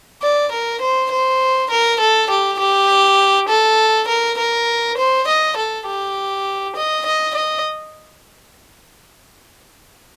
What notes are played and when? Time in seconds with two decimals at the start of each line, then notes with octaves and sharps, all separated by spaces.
0.23 D5
0.52 A#4
0.81 C5
1.11 C5
1.70 A#4
2.00 A4
2.30 G4
2.59 G4
3.49 A4
4.08 A#4
4.38 A#4
4.98 C5
5.27 D#5
5.57 A4
5.87 G4
6.76 D#5
7.06 D#5
7.35 D#5